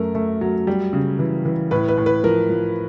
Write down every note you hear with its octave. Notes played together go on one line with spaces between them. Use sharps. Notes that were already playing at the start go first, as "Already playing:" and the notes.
Already playing: F#2 A3 A#4
A3
F#3
G3
C#3
E3
E3
A2 B4
B4
A2
B4
F3 A#4
F3